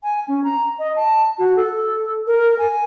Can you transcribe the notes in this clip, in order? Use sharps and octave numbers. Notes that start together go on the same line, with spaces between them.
G#5
C#4
A#5
D#5
A5
F#4
A4
A#4
G#5